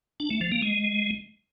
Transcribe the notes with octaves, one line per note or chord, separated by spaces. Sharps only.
D4
A3
F3
A#3
G#3